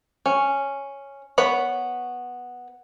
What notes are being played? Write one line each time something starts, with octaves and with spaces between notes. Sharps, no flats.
C#4
B3 B4 C#5 B5